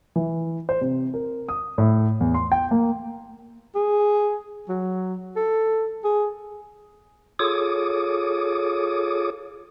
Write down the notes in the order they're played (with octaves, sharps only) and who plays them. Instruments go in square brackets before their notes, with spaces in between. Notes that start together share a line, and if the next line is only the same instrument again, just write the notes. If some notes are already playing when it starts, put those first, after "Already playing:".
[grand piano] E3
C5
C3
A#4
D#6
A2
E2
C6
G5
A#3
[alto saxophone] G#4
F#3
A4
G#4
[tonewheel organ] F4 G#4 A4 C#5 D6 D#6